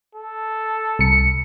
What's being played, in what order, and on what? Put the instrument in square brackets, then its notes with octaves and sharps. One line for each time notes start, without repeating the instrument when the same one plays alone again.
[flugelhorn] A4
[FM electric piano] C2 C#7